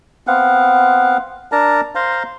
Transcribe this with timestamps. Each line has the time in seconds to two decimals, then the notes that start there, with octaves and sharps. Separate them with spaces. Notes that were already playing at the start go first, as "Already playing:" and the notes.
0.27 B3 C4 F5 F#5
1.52 D4 A#4 A5 A#5
1.95 C5 F5 A#5 C6